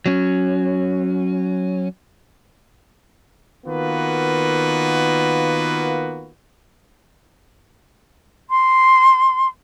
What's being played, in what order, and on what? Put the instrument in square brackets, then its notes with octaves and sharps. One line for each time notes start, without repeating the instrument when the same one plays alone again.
[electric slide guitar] F#3 C#4
[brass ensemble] D#3 A#3 B3 F4 F#4 B4
[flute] C6